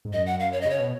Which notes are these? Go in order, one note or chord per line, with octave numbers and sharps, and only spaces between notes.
G#2
F#2 D#5
F#5
F5
C#5
D#5
C#3 C#5
B2